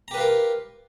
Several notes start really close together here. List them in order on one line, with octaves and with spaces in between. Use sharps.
A#5 G4 B4 F4 A#4